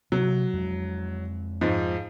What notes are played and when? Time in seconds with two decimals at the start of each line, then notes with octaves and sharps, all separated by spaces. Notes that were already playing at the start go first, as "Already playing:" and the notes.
0.12 C3 F#3
0.53 F2 G#3
1.61 G#2 F3